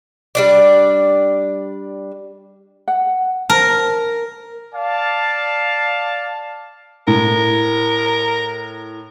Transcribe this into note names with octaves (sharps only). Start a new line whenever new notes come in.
G3 D4 D5
F#5
A#4 A5
D5 F5 A5
A2 A#4